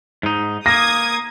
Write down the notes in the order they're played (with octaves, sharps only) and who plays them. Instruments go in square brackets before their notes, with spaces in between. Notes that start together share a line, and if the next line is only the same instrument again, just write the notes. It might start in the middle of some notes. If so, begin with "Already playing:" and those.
[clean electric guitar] G#2 D#4
[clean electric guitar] A#3 [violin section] D#6 G#6 [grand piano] A#6